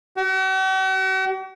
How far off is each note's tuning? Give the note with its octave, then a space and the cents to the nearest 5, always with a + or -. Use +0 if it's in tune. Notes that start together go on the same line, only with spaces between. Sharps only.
F#4 +45